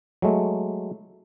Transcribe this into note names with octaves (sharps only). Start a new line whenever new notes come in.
F#3 G#3 A3